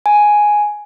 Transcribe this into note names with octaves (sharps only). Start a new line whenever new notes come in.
G#5